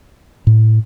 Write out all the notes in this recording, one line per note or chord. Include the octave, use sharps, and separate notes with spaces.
A2